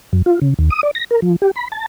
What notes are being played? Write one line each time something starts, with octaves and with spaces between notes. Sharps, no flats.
F#2
F4
C#3
D#2
D#6
D5
A#6
A#4
F3
G4
B5
A5